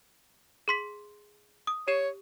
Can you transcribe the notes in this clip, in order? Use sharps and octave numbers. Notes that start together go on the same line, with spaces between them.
G#4 C6 B6
D#6
G4 C#5 C7 E7